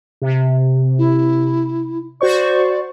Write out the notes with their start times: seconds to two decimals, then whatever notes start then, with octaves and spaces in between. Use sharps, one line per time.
0.22 C3
0.98 E4
2.21 F#4 C5 D5 C#6